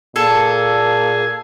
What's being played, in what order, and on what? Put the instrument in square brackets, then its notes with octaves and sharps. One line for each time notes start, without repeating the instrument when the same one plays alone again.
[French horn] A#2 [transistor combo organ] G#4 [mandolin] A4